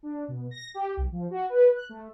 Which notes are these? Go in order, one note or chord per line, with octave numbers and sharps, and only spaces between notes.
D4
B2
A#6
G4
B1
F3
F#4
B4
F#6
A3